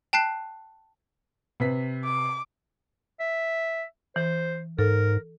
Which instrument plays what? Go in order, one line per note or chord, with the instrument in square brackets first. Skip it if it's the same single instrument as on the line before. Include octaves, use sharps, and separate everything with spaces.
[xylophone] G5 A5 F#6 C7
[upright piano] C3 B4 B6
[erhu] D6
[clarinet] E5
[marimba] E3 [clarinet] C5
[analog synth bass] G#2 [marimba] A4 [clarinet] A#4